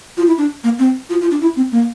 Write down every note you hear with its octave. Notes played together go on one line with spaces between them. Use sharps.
F4
E4
D4
A#3
C4
F4
F4
D4
E4
C4
A#3